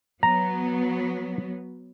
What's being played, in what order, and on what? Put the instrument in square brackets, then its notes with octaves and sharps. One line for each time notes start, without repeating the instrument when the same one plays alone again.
[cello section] F#3 B3 [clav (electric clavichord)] A#5